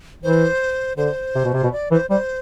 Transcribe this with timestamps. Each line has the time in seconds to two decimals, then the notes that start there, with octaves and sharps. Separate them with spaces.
0.23 E3 C5
0.97 D3 C5
1.35 C3
1.45 B2
1.54 C3
1.63 B2
1.72 D5
1.91 E3 C5
2.10 G3 C5